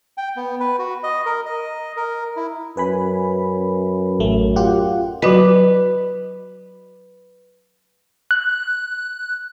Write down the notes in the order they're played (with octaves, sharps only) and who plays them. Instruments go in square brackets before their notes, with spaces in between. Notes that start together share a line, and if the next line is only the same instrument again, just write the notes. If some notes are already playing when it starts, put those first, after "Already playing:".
[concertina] G5
B3
B4
F#4
D#5
A#4
D#5
A#4
E4
[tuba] F#2 [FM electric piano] B4 G#5 B5
[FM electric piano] A1 A3
F4 G4 F#5
[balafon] F#3 F#4 D#5 [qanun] B4
[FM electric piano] F#6